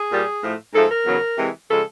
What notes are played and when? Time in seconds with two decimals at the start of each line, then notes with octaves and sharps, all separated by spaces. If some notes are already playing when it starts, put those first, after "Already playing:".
Already playing: G#4
0.10 A#2 G3
0.41 A2 F3 A3
0.73 G#2 F3 A3 A4
0.89 A#4
1.05 E2 C#3 F#3
1.37 C3 E3 G#3
1.69 C#3 F3 G#3 A4